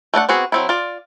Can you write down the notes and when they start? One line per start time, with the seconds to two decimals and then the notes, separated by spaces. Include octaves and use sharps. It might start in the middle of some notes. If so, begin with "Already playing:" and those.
0.14 A3 D4 D5 F#5
0.29 B3 C4 F#4 G#4
0.52 F#3 C4 E4
0.69 F4 D5